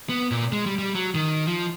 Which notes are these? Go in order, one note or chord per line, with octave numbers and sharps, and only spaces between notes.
B3
A#2
G#3
G3
G3
F#3
D#3
F3